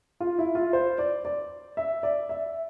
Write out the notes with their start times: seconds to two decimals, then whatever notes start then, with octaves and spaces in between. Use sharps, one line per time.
0.20 F4
0.39 E4
0.55 F4
0.73 C5
0.98 D5
1.25 D5
1.77 E5
2.03 D5
2.29 E5